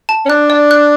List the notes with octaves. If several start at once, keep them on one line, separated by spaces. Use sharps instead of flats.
A5
C#4
D4 F#6
D5
F#6